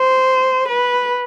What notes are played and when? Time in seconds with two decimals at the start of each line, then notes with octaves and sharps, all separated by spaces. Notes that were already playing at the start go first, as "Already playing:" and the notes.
Already playing: C5
0.68 B4